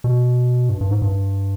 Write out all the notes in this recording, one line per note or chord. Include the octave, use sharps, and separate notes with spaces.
B2
G2
G2
G#2
G2